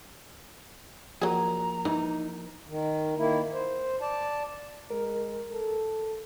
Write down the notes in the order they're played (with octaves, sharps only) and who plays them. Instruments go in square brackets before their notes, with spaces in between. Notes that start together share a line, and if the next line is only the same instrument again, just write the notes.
[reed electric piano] F3 A#3 A#4 [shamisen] F#3 G#4 [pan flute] A#5
[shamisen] E3 [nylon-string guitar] D#4
[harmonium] D#3
D#3 A#3 E4
C5
D5 A5
[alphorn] G#3 [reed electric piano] A#4
[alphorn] A4